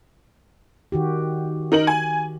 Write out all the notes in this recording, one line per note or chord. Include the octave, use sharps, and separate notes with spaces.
D#3 F#4 G4
D#4 A#4 F#7
G#5